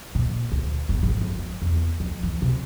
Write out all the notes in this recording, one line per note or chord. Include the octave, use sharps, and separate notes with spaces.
A#2
D2
G1
G#1
F2
G#3
E2
F2
E3
C3